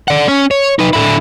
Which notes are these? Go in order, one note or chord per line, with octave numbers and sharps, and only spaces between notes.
D5 F#5
C#4
C#5
D#4 B4
D3 E4